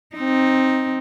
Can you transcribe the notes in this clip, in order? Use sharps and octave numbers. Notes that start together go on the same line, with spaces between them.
C4 D#4